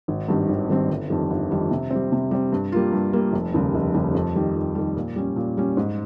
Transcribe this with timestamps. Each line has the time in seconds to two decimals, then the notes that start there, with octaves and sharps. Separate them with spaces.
0.08 G#1
0.28 G2 D#3 G3 C4
0.49 G#1
0.70 G2 D#3 G3 C4
0.89 G1
1.10 F2 D#3 G3
1.30 G1
1.51 F2 D#3 G3
1.71 C3
1.91 G3 C4
2.12 C3
2.31 G3 C4
2.52 G2
2.72 G3 A#3 F4
2.93 G2
3.13 G3 A#3 F4
3.33 F1
3.54 D#2 C#3 G3
3.75 F1
3.94 D#2 C#3 G3
4.14 F2
4.36 D#3 G3
4.55 F2
4.75 D#3 G3
4.96 A#2
5.16 G3 C#4
5.36 A#2
5.57 G3 C#4
5.77 G#2